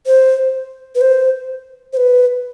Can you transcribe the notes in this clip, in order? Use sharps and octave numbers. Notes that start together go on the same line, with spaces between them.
C5
B4
C5
C5
B4